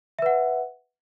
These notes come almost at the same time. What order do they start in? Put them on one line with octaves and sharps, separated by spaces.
E5 B4 F#5